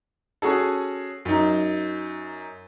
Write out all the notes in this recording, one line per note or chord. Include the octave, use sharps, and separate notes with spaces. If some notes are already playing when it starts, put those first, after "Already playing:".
C#4 F#4 G#4 A4
F#2 D#4